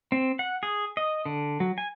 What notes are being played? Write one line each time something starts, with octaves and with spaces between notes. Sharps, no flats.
C4
F#5
G#4
D#5
D3
F#3
G#5